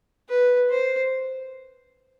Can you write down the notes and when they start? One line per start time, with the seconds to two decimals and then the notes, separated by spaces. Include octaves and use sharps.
0.29 B4
0.70 C5